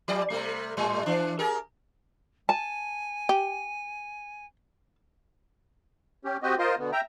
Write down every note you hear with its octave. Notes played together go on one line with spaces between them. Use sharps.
F3 G4 D5
C3 G3 A3
G#2 G3
E3 D4
G4 G#4 A#4
G#5 A5
G4
C#4 G4
C4 F#4 G4 D#5
F4 A#4 C5 D#5
B2 D3 B3
E5 G5 A#5